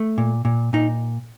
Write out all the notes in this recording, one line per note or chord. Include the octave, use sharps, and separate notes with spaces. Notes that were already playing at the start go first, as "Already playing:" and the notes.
Already playing: A3
A#2
A#2
A#2 D#4